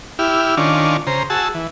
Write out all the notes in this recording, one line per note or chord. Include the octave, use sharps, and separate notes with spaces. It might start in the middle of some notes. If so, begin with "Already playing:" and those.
E4 G4 F6
D#3 C#4 D4 F4
C#3 C5 A#5
F#4 G#4 A5 E6
E3